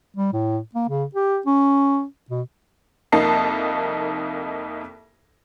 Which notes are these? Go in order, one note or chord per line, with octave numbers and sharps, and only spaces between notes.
G3
A2
A#3
C#3
G4
C#4
B2
C2 F2 A#3 D#4 A5 C7